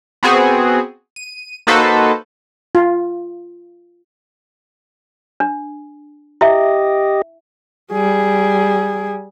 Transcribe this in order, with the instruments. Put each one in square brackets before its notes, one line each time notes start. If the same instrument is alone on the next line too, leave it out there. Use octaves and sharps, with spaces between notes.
[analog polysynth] B3 C4 F#4 G#4
D#7
A#3 D#4 F#4 A4 B4 C5
[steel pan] F4
[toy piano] D4
[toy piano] E4 E5 [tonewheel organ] G4 D#5
[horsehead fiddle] G3 G#4